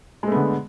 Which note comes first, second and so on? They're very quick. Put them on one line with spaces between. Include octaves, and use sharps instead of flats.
G#3 A3 B3 D3